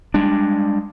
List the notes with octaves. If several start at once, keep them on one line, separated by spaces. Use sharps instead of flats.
G3 G#3 D4